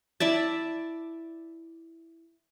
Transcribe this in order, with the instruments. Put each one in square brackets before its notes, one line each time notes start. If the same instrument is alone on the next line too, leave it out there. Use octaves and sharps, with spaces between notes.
[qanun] E4 D5 E5 A5